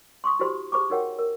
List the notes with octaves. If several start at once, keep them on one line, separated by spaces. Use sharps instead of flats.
C6 C#6 D#6
E4 F#4 G4 C5 B5 C6
G4 G#4 C5 B5 C#6 D6
D#4 F#4 A#4 C#5 F#5 G5
A#4